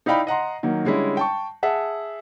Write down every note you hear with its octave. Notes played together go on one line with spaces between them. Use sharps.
D#4 E4 D5 F5 G5 B5
D#5 F#5 A#5 C6
D#3 F#3 A#3
D3 G3 G#3 C#4 E4
G5 A5 C#6
G#4 E5 F#5 A5